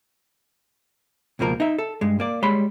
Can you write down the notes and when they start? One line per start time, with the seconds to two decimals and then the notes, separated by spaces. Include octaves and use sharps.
1.39 C#2 B2 F3 A#3 A#4
1.60 D#4 E5
1.78 A4
2.01 G2 G#3
2.20 A#3 D5
2.43 G3 G#3 C#5 B5 C6